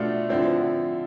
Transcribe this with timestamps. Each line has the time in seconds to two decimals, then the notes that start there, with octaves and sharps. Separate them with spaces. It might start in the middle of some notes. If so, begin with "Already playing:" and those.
Already playing: B2 A3 D4 F4 A4
0.29 D3 F3 C4 E4